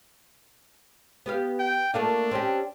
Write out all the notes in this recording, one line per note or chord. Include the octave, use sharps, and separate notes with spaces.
B3 G4 F5
G5
A3 A#3 D4 F4
C4 C#4 G4